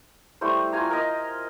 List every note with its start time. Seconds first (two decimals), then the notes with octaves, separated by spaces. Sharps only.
0.41 G3 A3 E4 C5
0.72 F4 G#5 A#5
0.90 A#4 D#5